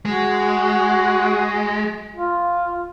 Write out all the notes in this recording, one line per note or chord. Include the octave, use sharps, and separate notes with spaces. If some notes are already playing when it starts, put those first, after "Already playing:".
G#3 F#4
F4